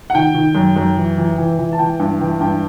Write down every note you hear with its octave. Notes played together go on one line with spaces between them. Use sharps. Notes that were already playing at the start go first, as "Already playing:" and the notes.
F#5
D#3 G5
D#3
F#2
F#2
E3
E3
E3
E3
A5
E3 G5
G2
E3 G5
G2 G5